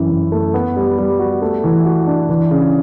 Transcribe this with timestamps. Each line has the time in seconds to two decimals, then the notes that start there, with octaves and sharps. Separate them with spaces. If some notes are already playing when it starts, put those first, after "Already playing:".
Already playing: F#2 E3 E4
0.10 F#2
0.32 A3
0.54 B3
0.77 G3
0.98 G3
1.19 F#4
1.42 A3
1.64 E3
1.85 F#4
2.07 D4
2.29 E3
2.51 C#3